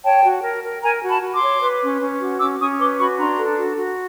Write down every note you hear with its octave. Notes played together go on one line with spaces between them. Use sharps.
C#5 G5 A5
F#4
A#4
A#4
A#4 G#5 A#5
F#4
A5 B5
F#4
C6 D6
C#5
B4
C#4
C#4
F#4
C#4 D6 E6
C#4 C#6 D#6
B4 C6 D6
F#4 B5 C#6
D4 A#5 C6
A4
F#4
F#4